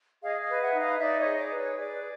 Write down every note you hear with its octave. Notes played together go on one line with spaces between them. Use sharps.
G#4 D#5 F5
D#5 F5
B4
E5 F#5
D#4
D#5 F5
D#4 D5 E5
C#5 D#5
G#4
D5
B4
C#5
G#4 D5